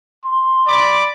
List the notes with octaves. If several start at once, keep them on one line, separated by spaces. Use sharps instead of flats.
C6
D5 B5 D6